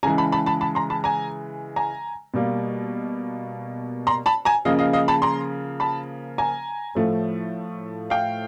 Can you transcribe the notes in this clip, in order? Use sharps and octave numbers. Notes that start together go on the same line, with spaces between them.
C#3 E3 G#3 G#5 A#5
A5 B5
A5 B5
A5 B5
A5 B5
A#5 C6
A5 B5
G#5 A#5
G#5 A#5
B2 G3 A#3
A#5 C6
A5 B5
G#5 A#5
C#3 F3 A#3 D#5 F5
D#5 F5
D#5 F5
A5 B5
A#5 C6
A5 B5
G#5 A#5
A2 F3 A3
F5 G5